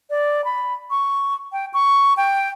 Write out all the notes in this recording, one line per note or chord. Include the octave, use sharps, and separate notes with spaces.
D5
B5
C#6
G5
C#6
G5